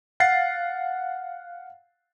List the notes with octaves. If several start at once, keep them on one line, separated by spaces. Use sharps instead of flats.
F5 F#5 A6 C7